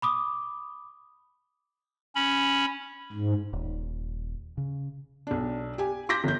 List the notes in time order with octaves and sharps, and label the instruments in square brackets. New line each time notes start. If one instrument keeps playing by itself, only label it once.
[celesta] B5 D6 D#6
[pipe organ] C#4 B5
G#2
[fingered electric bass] D#1
C#3
[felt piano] B1 D4
G4 G#5
C6 D6 G6 A#6 B6
G1 G6